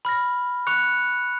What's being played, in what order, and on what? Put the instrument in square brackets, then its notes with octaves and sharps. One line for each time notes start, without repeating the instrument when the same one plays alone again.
[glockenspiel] B5 F6 A#6
C#6 F#6 C#7 F7